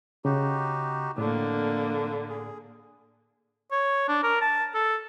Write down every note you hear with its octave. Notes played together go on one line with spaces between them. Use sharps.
C#3 D#4 F#4 G4
F2 A2 D3 A#3 D4
G#4
C#5
D4
A#4
A5
A4